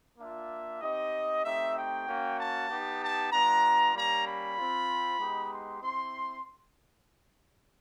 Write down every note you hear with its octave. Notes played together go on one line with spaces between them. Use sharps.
A#3 D4 F4 E5
C4 D#4 G4 D#5
A3 C4 D#4 G4 E5
G5
A#3 C#4 F#4
A5
B3 D#4 G4
A5
G3 B3 D4 F4 A#5
G3 A#3 C#4 A#5
B5
C4 F4
G#3 B3 D#4 G4
C6
C4 E4 C6